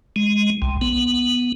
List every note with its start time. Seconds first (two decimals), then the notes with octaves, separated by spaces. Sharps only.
0.16 G#3
0.62 C2
0.81 B3